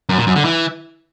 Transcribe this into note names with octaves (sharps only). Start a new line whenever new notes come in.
F#2
A#2
F#2
D3
E3